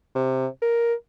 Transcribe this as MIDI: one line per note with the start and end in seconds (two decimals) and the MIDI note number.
0.15 0.47 48
0.62 0.94 70